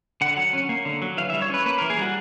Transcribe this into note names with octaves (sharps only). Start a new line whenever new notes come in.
D3 F#5
F#3
C#4
A#3
D3
F#3
E3 F5
G3 E5
C#5
C#4 B4
A#3 B4
E3 A#4
G#4
G3 F#4